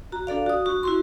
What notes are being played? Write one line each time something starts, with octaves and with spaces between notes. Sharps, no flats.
F#4 A#5
D4 A4 D5 F5
F#4 D#6
F#4 C#6
E4 F#4 C6